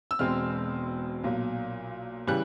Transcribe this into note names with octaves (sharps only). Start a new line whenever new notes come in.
E6
E1 E2 B2 G#3 C4 F6
B1 A#2 F#3
C#3 E3 G3 F#6